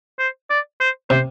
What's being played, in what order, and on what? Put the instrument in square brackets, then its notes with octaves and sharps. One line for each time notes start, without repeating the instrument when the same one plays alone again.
[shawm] C5
D5
C5
[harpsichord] C3 [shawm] C5